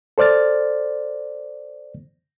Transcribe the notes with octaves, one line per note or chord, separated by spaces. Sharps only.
A4 C5 D5 F6 A6